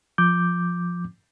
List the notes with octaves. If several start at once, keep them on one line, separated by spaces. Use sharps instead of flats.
F3 D6 G6